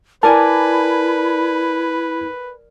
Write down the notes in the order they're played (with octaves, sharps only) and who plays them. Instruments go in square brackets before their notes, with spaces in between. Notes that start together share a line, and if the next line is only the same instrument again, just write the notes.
[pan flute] E4 [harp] A#4 D5 G#5 [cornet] B4 [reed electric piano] A5